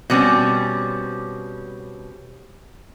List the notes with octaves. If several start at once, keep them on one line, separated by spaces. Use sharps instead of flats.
B2 G3 C4 C#4